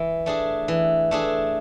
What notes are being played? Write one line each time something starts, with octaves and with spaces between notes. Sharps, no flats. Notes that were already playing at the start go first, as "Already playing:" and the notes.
Already playing: E3
A3 D4 G#4
E3
A3 D4 G#4